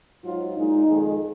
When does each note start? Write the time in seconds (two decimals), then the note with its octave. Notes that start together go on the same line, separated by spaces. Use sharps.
0.23 G#2 F#3 F4
0.56 A#2 G#3 D#4
0.86 F2 D#3 G#3